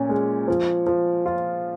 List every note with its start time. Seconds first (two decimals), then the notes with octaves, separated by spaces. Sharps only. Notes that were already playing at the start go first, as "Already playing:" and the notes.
Already playing: A#2 C#4
0.09 G#3
0.48 F3
0.86 F3
1.26 F4